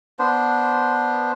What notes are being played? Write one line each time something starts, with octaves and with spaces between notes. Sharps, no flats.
B3 D4 C5